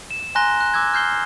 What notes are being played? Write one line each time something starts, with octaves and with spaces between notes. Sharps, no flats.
E7
G#5 A#5 C6 F#6 A#6 G7
F#6
D6 E6 F#6 G#6
F6 G6 C7 G7